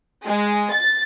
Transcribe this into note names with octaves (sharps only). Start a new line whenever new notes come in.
G#3
A6